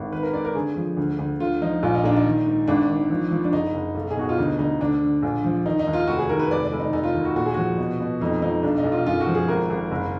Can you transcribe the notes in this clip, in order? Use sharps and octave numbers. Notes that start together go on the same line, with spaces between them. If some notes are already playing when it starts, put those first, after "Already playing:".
Already playing: G#1
D#3 B4
A#4
G#2 D5
A#4
D3 G#4
F3
D2
D2
D3 F4
F3 D#4
A#1 F4
D#4
A#2 D4
D#4
D#3
G#2
G#1 D4
D#3
F3
F3
D4
F#1 D#4
F#1
B1
G#4
B2 F#4
F4
D2 D#4
D2 D#4
D2 D4
D3
A#1
F3
D#3 D#4
D#4
D#2
F4
F1 F#4
G#4
D#3 A#4
B4
F1 D5
D5
F1
D#4
F1 D#4
F4
D#2
F#4
A#2 F#4
G#4
F3 F#4
B2
B2
F2 D#4
F3 D#4
B1 D4
D#4
B1
F4
F#2 F4
F#4
F3
G#4
G#1 A#4
G#1
F#1